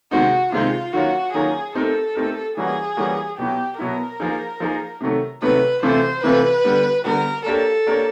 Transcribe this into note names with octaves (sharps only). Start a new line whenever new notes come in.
C3 D#3 G#3 C4 D#4 F#4
C3 D#3 G#3 C4 D#4 F4
D#3 F#3 A#3 C#4 F4 F#4
D#3 F#3 A#3 C#4 F4 G#4
A3 C4 D#4 G4 A4 A#4
A3 C4 D#4 G4 A#4
E3 G3 A#3 C#4 F#4 G#4
E3 G3 A#3 C#4 F#4
B2 F#3 B3 E4 G4
B2 F#3 B3 E4 A#4
F3 A#3 D#4 G#4
F3 A#3 D#4 G#4
C3 D#3 F#3 A3
C3 D#3 F#3 A3 B4
C3 E3 A3 C4 F4 C5
C3 E3 A3 C4 F4 B4
D3 G3 B3
D3 G3 B3 A#4
A#3 D4 G4 A4 A#4 C#5
A#3 D4 G4 A#4 C#5